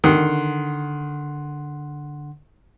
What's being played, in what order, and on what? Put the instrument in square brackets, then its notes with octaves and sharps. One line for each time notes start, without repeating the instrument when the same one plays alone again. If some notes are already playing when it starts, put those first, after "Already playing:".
[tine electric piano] D3 F#5 C6 [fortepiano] D#3